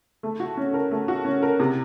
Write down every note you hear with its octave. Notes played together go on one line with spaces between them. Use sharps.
A3
F#4
C#4
A#4
A3
F#4
C#4
A#4
C3